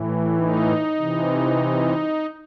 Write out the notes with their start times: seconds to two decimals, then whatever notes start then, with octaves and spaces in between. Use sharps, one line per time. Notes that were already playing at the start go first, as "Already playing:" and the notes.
Already playing: A2 E3
0.37 D#4
0.97 C3 E3